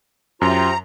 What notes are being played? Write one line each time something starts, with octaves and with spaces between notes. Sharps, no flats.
F#2 F4 G4 C5 E5 A#5